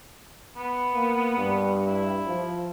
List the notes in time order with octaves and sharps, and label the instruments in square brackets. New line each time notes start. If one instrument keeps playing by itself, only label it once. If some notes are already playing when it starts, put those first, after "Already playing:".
[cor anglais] B3
[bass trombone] A#3
G2
[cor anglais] E4
[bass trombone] F3